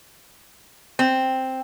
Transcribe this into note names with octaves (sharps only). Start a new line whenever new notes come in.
C4